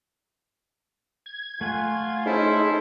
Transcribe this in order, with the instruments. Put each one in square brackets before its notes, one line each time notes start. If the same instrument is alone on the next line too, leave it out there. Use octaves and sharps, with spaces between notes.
[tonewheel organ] G#6
[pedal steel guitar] A3 F#5 G#5 [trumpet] F4
[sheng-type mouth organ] C#4 A4 C5 [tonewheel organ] D#4 G#4 [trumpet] E4